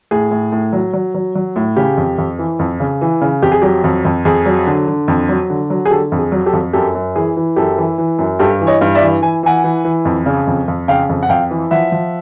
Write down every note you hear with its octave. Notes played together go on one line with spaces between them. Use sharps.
A2 G#4
A2
A2
F#3
F#3
F#3
F#3
A2
C#3 G4
F2
F2
E3
F2
C#3
E3
C#3
F2 G4
G#4
F#3 G4
F2
F2
F2 G#4
F#3
D3
D3
F2
F#3
D3
F#3
G#4
D3 G4 A4
F2
G#4
F#3
G4 A4
F2
F#2 G4 A4
F#2
E3 G#4
E3
F#2 G4 A4
E3
E3
F#2
G2 G4 A4
E3
C#5 D#5
G2
D5 E5
E3
E3 G#5
E3 F#5 G#5
E3
E3
F2
C#3
F2
F2
C#3 F5 G5
F2
F#5
F2 F5 G5
E3
F3 E5 F#5
F3